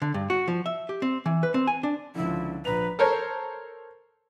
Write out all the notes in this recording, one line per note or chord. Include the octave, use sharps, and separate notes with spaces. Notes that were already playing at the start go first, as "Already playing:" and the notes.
D3
G2
F#4
F3
E5
G4
C4
E3
B4
C4
G#5
D4
C#2 D3 F3 E4
A#1 F3 B4 A#5 F7
A4 A#4 C5 C#5